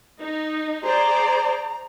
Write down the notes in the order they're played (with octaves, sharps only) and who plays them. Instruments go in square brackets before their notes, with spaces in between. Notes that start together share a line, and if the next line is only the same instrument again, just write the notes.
[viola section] D#4
[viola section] G#4 C5 D5 [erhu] A#5